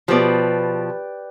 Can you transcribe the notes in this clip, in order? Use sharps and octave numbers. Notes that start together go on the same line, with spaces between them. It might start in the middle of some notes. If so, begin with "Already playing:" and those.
B2 F3 G4 B4 D5